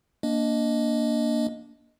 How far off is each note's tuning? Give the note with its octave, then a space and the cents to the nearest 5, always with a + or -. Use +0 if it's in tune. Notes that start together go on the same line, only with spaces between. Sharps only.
A#3 +5 D4 -10 D#5 +0